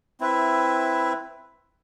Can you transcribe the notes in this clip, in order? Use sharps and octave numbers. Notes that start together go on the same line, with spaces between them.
C4 E4 B4 E5